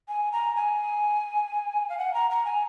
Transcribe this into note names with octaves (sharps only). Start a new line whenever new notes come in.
G#5
A#5
G#5
F5
F#5
A#5
A#5
G#5